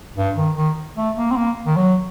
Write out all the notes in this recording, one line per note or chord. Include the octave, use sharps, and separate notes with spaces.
G2
D#3
D#3
A3
A#3
C4
A#3
D#3
F#3